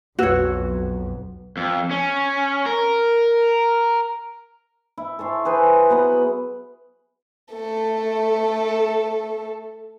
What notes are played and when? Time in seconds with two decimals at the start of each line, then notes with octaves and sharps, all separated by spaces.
0.19 B1 F2 F#4 B4 C#5 E6
1.57 F2
1.91 C#4
2.66 A#4
4.98 E4
5.19 A4 C#5 A5 C6
5.45 G#4 B4 C5
5.90 F#3 B3 F#5 B5
7.52 A3 A4